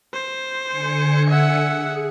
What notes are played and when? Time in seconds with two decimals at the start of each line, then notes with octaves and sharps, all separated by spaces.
0.13 C5
0.65 D3 G#5 C#7
1.30 E5 F#5
1.68 G#4